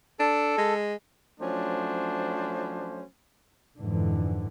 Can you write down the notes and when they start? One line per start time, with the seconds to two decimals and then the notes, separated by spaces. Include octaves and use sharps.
0.20 D4 A4
0.58 G#3
1.40 F3 F#3 A3 C#4 D4 C5
3.78 F2 G#2 D3 E3